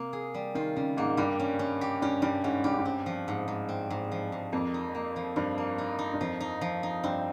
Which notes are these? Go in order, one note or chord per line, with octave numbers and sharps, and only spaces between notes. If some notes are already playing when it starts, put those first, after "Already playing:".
Already playing: C3 A#3
G#4
G3
D#3 F4
C#3 G3
G#2 A#3
G2 G3
C#4
C#4
G4
G2 C#4
G2 G3
G#2 C#4
G2 G4
G#2
G2
C4
F3
G#2
G#2
C4
G#2
F3
G#2
F2 A#3
D#4
A#3
F3
G2 F3
A#3
D#4
D#4
G2
F2 F3
D#4
F3
D#4
G2 C4